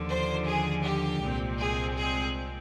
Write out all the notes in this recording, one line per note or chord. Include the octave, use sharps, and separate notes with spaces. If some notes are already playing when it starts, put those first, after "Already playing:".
Already playing: D#2 D3 F3
C5
G#4
G4
C2 A#2 G#3 C4
G#4
G#4